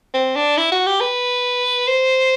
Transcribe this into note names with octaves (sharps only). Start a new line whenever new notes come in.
C4
D4
E4
F#4
G4
B4
C5